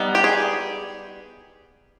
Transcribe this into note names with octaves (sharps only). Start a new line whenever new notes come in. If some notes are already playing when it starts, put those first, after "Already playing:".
Already playing: G3 B3 D#4
G4
G#4